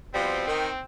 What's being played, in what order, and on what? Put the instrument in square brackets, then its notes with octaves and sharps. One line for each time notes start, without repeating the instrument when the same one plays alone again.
[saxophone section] B2 F3 G3 [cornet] C4
[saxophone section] D#3